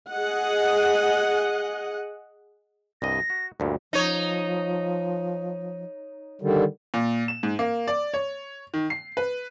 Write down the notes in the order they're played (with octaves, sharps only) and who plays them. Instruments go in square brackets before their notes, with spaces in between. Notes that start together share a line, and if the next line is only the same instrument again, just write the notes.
[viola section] G#4 D#5 F#5
[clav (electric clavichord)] C2 G2 D#5 [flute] A#6
[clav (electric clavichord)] F#4
[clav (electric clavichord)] D2 G2 A#2 [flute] F#4
[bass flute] F3 [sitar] D#4 C#5
[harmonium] D3 D#3 G3
[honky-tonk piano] A#2
E7
G#2
A#3
D5
C#5
D#3
C7
B4